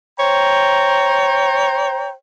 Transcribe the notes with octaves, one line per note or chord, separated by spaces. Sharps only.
C5 C#5 G5 A#5